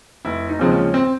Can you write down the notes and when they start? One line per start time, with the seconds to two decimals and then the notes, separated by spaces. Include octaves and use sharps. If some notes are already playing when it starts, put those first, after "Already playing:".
0.25 F1 E4
0.49 D#4
0.59 D#2 C#3 F3 G#3 C4
0.72 C#4
0.94 C4